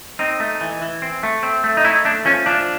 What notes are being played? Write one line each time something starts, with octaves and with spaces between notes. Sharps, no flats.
C4 D#4
A3
E3
E3
C4
A3
C4
A3
D#4
A3 E4
A3 D4
F3 C#4
F3 D4